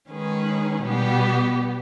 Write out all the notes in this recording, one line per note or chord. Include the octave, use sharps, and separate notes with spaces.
D#3 G#3 C#4 G#4 B4
B2 G3 B3 G4